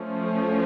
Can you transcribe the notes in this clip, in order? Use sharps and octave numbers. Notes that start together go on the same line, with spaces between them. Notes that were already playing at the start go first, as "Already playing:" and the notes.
Already playing: F3 A3 C#4